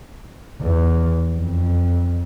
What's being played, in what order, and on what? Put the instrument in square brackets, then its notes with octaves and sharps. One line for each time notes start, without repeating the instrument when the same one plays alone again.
[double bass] E2
F2